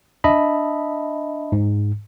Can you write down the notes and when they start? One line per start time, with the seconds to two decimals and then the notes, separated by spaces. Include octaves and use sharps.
0.24 D4 D#5 E5 A5 B5
1.52 G#2